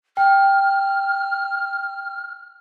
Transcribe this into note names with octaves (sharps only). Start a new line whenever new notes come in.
G5 F6